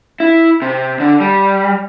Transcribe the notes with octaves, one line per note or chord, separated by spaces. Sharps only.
E4
C3
D3
G3